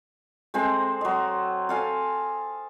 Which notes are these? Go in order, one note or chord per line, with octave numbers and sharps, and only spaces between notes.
G#3 C4 A4 C5
F#3 D#5
A4 F5 G#5 A5